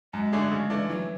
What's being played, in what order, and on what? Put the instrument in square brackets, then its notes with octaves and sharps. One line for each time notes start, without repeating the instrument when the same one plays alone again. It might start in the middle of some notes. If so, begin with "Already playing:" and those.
[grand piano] F#2 [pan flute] G#3
[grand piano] D3 A3 D4 G#4
C#3
E3 A3 D4
[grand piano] E3 [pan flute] F#3